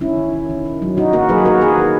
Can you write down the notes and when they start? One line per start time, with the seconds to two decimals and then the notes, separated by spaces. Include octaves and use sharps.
0.01 D#3 C#4 E4
0.17 D#3
0.33 D#3
0.50 D#3
0.65 D#3
0.82 F#3
0.97 D#3 D#4 F#4
1.13 A#3 F#4 A#4
1.29 F#3 G#4 B4
1.45 D#3 F#4 A#4
1.61 D#3 G#4 B4
1.78 D#3